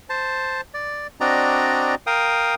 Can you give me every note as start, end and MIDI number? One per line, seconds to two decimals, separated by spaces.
0.09 0.61 72
0.09 0.61 81
0.74 1.07 74
1.21 1.95 60
1.21 1.95 62
1.21 1.95 66
1.21 1.95 74
1.21 1.95 75
1.21 1.95 82
2.07 2.55 70
2.07 2.55 77
2.07 2.55 79
2.07 2.55 87